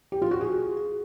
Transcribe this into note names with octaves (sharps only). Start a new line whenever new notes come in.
G4
F4
F#4
G#4